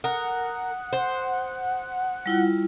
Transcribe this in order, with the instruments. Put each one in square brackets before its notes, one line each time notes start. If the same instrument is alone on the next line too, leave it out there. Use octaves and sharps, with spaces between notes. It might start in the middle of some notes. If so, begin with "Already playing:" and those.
[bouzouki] A#4 [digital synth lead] F#5 [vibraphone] D#6
[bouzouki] C5
[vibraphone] G3 E4 F4